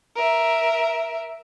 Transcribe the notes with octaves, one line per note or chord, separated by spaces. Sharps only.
A#4 E5